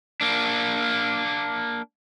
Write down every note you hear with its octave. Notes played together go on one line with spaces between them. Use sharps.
A#3 D4